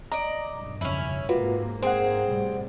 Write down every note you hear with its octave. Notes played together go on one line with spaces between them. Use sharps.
D5 D#5 A#5
B1 G2
F2 C#3 C#4 E4
G#2 C3 A#3 F4 F#4 B4
C4 G#4 C5 F#5
A2 C3 G3